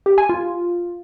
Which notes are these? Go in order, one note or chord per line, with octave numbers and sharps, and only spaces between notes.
G4
G#5
F4